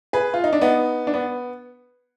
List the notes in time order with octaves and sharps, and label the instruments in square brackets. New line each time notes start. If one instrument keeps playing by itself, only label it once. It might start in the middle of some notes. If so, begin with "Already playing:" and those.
[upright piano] G#4 B4
F4
D#4
D4
B3 D#4
D4
B3